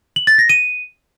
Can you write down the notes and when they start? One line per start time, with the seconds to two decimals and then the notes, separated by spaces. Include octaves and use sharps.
0.16 F#7
0.27 A6
0.38 A#6
0.49 D#7